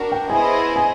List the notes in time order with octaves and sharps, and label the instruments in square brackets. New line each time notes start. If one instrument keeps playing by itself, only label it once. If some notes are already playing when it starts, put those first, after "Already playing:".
Already playing: [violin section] D4 F#4 A#4
[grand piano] G5
[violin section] B3 E4 G#4 C5 D#5 [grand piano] G#5
[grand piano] G#5